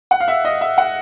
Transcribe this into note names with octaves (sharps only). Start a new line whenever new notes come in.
F#5
F5
E5
D#5
E5
F#5